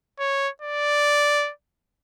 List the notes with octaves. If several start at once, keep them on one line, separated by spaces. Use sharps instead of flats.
C#5
D5